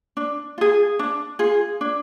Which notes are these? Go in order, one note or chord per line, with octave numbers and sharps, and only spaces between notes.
D4
F4 G#4
D4
F4 G#4
D4